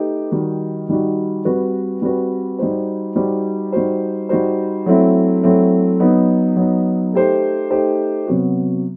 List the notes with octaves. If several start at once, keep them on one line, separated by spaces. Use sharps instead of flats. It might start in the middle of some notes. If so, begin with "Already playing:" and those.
Already playing: A3 D#4 G4 B4
D#3 G3 D#4 F#4
D#3 G3 D#4 F#4
G3 C4 F#4 B4
G3 C4 F#4 B4
G3 D#4 F#4 C5
G3 D#4 F#4 C5
G3 D#4 F#4 C5
G3 D#4 F#4 C5
F#3 A3 C4 E4
F#3 A3 C4 E4
F#3 B3 D#4
F#3 B3 D#4
A3 D#4 G4 C5
A3 D#4 G4 C5
C3 F#3 B3 F#4